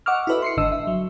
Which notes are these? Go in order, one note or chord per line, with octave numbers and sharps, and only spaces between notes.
D#5 F#5 C#6 D6 E6 F6
E4 F#4 A4 B4 D#5 E5
C6 C7 C#7
G1 G#2 D3 D#5 E6
E5
F#3